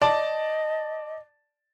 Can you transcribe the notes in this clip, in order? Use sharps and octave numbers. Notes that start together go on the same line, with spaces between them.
D5 D#5 A5